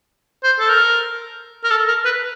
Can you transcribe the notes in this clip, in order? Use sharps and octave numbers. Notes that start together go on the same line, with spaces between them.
C5
A4
A#4
A#4
A4
A#4
B4